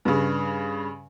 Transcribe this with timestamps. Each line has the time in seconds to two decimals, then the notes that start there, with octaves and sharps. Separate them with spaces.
0.05 G2 C#3